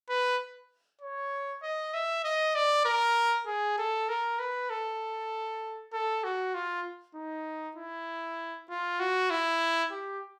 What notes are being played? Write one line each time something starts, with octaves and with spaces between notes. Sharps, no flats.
B4
C#5
D#5
E5
D#5
D5
A#4
G#4
A4
A#4
B4
A4
A4
F#4
F4
D#4
E4
F4
F#4
E4
G4